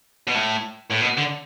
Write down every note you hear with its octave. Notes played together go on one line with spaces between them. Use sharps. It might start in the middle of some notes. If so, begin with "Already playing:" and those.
B2
A2
A2
B2
D3